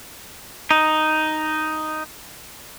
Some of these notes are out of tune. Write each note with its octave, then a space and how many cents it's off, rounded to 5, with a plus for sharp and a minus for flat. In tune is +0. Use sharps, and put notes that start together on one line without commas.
D#4 +0